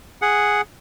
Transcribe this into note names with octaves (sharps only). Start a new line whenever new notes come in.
G#4 F#5